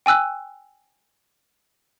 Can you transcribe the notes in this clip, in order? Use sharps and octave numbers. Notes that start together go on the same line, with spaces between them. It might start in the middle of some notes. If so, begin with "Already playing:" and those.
G5 G#5 E6 F#6